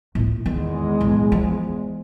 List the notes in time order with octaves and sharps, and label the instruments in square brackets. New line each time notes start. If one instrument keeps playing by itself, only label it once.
[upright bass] A2 F4
[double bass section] E2 G#3 [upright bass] D#3
[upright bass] B1 A2
F3